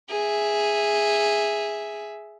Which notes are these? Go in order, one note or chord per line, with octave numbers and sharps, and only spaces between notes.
G#4 E5